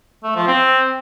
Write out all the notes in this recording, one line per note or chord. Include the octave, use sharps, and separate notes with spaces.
A3
F3
C4